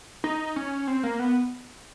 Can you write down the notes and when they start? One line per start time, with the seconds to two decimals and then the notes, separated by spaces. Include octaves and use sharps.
0.24 D#4
0.56 C#4
0.87 C4
1.03 A#3
1.19 B3